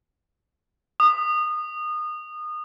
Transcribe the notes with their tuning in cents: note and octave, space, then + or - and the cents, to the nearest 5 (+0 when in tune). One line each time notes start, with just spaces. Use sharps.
D#6 -25